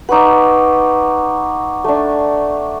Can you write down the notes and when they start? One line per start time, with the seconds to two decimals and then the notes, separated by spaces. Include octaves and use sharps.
0.09 D#4 B4 F#5 C#6 D6
1.84 A3 D4